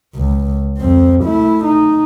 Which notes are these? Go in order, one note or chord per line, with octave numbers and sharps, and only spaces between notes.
C#2
F2 C4
A3 E4
D#4